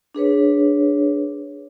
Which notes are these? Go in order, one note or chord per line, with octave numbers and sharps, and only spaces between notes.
D4 G#4 B4 C#5